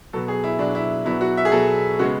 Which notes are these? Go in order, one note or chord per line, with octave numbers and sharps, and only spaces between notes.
B2 F#3 B3 A4
G#4
E4
B2 F#3 B3 D4
E4
B2 F#3 B3 E4
F#4
E5
G#4
B2 F#3 B3 A4
C#3 G#3 B3 F#4